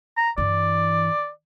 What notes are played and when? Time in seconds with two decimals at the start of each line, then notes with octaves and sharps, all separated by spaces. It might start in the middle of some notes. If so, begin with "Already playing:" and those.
0.17 A#5
0.38 G2 E3 D5